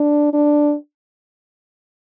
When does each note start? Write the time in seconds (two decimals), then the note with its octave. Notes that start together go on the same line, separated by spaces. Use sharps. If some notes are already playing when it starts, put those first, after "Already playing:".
Already playing: D4
0.33 D4